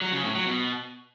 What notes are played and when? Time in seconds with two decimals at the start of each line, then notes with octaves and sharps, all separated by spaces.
0.02 F#3
0.13 C#3
0.24 A2
0.35 F#3
0.46 B2